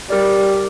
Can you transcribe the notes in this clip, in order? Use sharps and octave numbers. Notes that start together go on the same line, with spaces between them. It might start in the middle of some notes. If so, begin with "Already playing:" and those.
G3 G4 A#4 D5